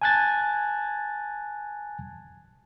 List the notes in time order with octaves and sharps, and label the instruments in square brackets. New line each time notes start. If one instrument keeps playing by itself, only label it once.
[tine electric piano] G#5 A5 F#6 G#6 A6